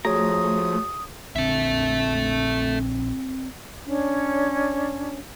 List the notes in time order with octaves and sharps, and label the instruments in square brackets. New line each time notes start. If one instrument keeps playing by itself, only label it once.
[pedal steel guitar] F3 A#5 [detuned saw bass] A3 [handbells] F#4 G#4 C#5 [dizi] D#6
[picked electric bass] A#1 D3 [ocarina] C4 [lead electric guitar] A4 E5
[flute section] C#4 D4 C#5